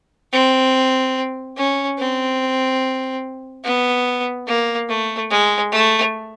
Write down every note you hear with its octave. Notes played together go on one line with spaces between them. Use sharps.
C4
C#4
C4
B3
A#3
A3
G#3
A3